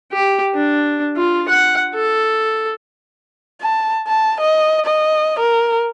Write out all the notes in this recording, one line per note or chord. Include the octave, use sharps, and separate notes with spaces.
G4
D4
F4
F#5
A4
A5
A5
D#5
D#5
A#4